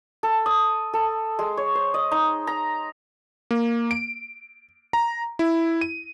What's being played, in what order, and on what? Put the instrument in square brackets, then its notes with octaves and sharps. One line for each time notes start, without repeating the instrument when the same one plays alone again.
[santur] A4
D#6
A4
G#3
C#5
C5
D#5
D#4
A#5
[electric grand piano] A#3
D7
A#5
E4
D#7